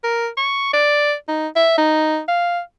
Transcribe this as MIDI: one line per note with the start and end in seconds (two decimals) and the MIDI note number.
0.04 0.28 70
0.37 0.70 85
0.73 1.14 74
1.28 1.48 63
1.56 1.74 76
1.78 2.20 63
2.28 2.60 77